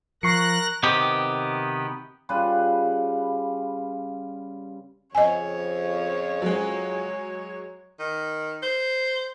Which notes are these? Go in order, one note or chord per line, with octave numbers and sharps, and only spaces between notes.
F3 A#4 C#6 F#6 A#6 C7 C#7
C3 D#3 B3 G4
C#3 G3 F4 B4
F2 C#3 C4 C#5 D#5 G#5
F#3 G#3
D#3
C5